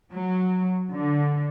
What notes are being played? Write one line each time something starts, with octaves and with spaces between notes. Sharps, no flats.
F#3
D3